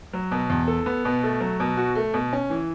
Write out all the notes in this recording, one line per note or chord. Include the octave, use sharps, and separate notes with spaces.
F#3
B2
E2
A4
B3
B2
A3
F#3
B2
F#4
A3
B2
C#4
E3